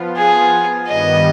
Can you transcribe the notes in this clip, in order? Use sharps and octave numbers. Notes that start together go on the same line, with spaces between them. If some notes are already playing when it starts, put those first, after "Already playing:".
Already playing: F3 B3 F4
G#4
G2 D#3 G3 B3 D#5